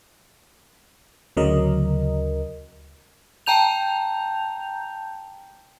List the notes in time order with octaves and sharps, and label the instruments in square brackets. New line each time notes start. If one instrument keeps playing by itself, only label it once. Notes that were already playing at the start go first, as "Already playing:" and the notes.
[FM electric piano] D2 C#3 F#3 A#4 D#5
[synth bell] G5 A5 A#5 G6 F7